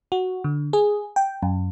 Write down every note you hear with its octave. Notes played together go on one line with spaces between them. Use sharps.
F#4
D3
G#4
G5
F#2